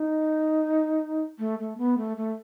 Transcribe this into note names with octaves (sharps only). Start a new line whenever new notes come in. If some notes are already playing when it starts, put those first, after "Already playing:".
Already playing: D#4
A3
A3
B3
A3
A3